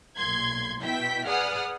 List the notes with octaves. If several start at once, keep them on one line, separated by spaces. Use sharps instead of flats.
B1 A#2 C6 G#6
B2 E4 E5 G5 B6
G#4 B4 D5 F#5 D#6 F6